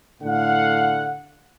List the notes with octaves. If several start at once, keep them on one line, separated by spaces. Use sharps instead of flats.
A2 D3 F5 F#5